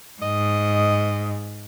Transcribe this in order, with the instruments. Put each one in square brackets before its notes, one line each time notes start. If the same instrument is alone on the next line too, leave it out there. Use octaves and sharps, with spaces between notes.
[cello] G#2 [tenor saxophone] D#5